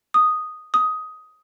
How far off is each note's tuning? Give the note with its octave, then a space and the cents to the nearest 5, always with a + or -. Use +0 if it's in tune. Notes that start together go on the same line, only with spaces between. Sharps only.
D#6 -5
D#6 +10